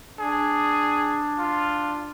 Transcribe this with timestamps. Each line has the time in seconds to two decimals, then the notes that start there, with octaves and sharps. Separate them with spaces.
0.19 D4 G#4
1.39 F4